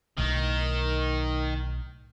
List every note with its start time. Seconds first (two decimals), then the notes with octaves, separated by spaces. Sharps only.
0.18 B1 A2 D#3